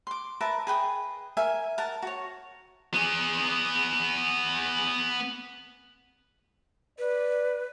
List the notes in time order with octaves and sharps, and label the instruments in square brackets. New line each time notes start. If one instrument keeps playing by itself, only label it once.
[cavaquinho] C6 D6
A#4 B4 E5 A5
G#4 B4 G5 D#6
A#4 E5 G#5
A#4 F#5 A5
F#4 C#5
[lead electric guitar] B3 G#4
[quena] B4 [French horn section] D5